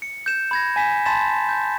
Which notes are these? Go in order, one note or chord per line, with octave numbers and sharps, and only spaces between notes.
C#7
G6 E7
B5 G#6 A#6
G#5 B6 E7
A5 B5 C6 A6 B6 E7
G6